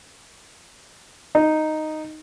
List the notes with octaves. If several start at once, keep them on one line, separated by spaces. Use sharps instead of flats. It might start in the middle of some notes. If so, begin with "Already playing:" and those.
D#4